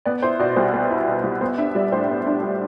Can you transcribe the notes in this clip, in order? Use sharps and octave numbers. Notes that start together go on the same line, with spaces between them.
B3 D5
E4 C5
B2 D5
C2 C5
B3 B4
E4
B2
C2
B3 C5
D4 E5
G3 D5
A2 C5
B3
D4
G3